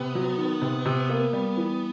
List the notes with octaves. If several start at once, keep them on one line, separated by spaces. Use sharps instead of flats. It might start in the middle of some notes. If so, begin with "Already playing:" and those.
Already playing: C3 B3
F#3
D#3
C3
C3
A#3
G3
E3